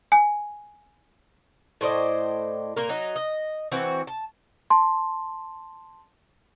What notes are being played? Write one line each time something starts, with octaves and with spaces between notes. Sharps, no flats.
G#5
A2 C5 D5 D#5
A#2 A#3 A#4
F#3 D#4
D#5
E3 C4 F#4
A5
A5 C6